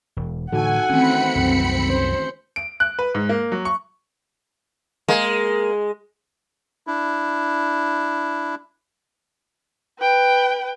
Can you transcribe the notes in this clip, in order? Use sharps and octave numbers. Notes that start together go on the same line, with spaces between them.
E1
A2 D3 E3 D#4 F#4 A4 F#5 G#5
D#3 E3 A3 C4 C#4 B5 C#7
C2 F#2 C3
C#4 C5
D7
F#6
B4
G#2
A#3
F#3
C#6
G#3 A#3
D4 E4
B4 G5